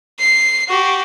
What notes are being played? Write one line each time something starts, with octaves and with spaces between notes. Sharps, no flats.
C7
F#4 G4